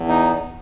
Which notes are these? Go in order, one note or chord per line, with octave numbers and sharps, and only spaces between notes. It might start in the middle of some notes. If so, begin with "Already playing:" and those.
Already playing: E2
D#4